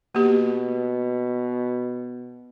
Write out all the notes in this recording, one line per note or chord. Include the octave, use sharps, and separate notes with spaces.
B2 A#3 G4